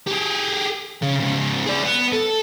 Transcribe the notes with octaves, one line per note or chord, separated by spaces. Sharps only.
G4 G#4
C#3 C#4
G#2 C#3
G#4 D5
B3
A4